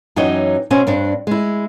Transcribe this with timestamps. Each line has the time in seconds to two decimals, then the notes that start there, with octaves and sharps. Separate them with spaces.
0.16 F#2 E3 D#4 C#5 D#5 G5
0.70 B2 C4 C#4 C5 G#5
0.87 G2 C4 D4
1.27 G#3 E4